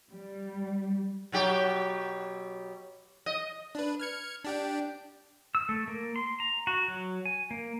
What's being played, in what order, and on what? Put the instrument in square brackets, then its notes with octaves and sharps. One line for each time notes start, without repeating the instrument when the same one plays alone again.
[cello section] G3
[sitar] B2 F#3 G4
D#5
[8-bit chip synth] D4 B4
F6 G#6 C#7
D4 G4 G5
[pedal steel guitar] E6
A3
A#3
C6
A#5
F#4
F#3
G#5
A#3